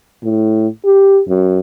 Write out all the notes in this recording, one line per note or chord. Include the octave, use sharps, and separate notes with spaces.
A2
G4
F#2